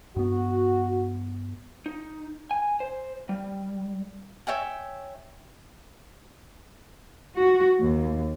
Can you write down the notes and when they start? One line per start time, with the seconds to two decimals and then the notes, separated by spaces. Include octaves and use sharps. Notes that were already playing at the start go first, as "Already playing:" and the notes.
0.16 G2 B3 F#4
1.86 D#4
2.51 G#5
2.80 C5
3.29 G3
4.47 C#5 E5 G5 G#5
7.35 F#4
7.80 D#2